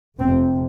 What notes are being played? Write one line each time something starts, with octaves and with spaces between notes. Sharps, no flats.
F1 F2 C3 C4